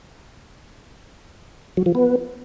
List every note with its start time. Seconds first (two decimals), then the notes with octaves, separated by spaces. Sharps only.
1.77 F#3
1.86 F3
1.95 B3